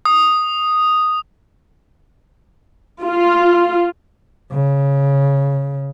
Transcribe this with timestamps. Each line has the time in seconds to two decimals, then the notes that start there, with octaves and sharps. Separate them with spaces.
0.05 D#6
3.05 F4
4.52 C#3